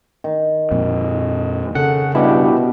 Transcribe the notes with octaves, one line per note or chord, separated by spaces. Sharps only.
D#3
F2 A#2
C#3 A4 F#5
G2 B2 E4 G4